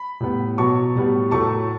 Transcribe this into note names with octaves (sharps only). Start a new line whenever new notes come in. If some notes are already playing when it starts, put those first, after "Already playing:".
Already playing: B5
A2 G3 B3
B2 F#3 B3 A5 C#6
A2 G3 B3
A2 F#3 A3 A5 C#6